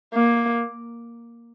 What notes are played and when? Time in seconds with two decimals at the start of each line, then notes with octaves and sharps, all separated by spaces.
0.14 A#3